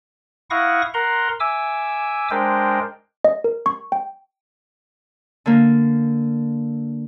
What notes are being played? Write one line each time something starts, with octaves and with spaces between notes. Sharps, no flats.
E4 F5 F#5 C#6 D#6 A#6
A#4 F#5 A#5 C6
E5 G#5 D6 E6
G#3 D4 A#4 C5 G5
D#5
A#4
C#6
G5
D3 A#3